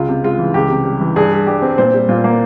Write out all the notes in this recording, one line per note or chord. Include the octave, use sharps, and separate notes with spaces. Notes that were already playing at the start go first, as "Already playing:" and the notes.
Already playing: C#2 F4
C3
G#3 F4
E3
C#2 G4
C3
G3
E3
G2 G#4
G3
G2 G4
C4
A#2 C5
G3
A#2 F4
A#3